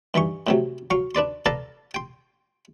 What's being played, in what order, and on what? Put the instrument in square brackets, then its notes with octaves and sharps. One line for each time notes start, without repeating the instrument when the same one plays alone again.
[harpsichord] G2 E3 D#4 C#6
A2 C3 F#3
F#3 F5 C#6
D4 B4 D5 C6
A4 B4 D5 F5 A5 A#5
G5 C6